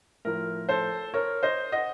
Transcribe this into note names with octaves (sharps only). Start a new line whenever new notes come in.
A2 F3 A#4
A4 C5
A#4 C#5
C5 D#5
D#5 F#5